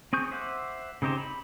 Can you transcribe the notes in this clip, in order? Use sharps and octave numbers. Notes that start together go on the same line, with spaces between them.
C4 G#4 C#6 G6
C5 E5 F#5 D6
C#3 C4 D#4 G4 C5
B5